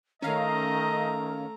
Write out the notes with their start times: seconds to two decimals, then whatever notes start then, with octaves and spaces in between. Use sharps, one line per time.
0.22 D#3 A3 C#4 D#5 F5 A#5